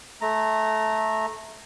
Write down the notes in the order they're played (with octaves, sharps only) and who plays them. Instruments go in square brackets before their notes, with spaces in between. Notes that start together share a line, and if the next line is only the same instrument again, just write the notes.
[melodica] A3 A#5